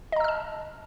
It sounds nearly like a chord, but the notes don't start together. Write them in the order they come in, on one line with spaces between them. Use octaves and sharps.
D#5 A#5 E6 F6 A5